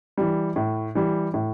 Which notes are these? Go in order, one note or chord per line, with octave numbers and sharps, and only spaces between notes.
E3 G3
A2
E3 G3
A2